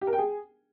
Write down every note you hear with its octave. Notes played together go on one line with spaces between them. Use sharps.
G4
A#4
G5
G#4